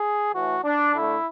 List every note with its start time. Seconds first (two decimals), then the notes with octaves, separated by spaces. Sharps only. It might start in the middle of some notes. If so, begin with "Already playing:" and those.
Already playing: G#4
0.35 A2 E3 A3 F#4
0.65 D4
0.95 D3 A3 E4